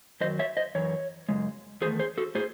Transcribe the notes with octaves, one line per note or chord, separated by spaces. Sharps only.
F#2 D#3 F#3 C5 D#5
C#5 E5
C5 D#5
F#2 E3 C#5
F#2 C#3 G#3
E2 D#3 A3 G#4 C5
G#4 C5
F#4 A4
A2 G#4 C5